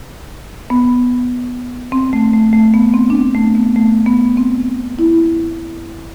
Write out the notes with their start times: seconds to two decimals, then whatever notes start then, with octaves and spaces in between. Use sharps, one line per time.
0.70 B3
1.92 C4
2.13 A3
2.33 A3
2.53 A3
2.74 B3
2.94 C4
3.10 D4
3.15 C4
3.35 A3
3.55 B3
3.76 A3
4.06 B3
4.37 C4
4.99 E4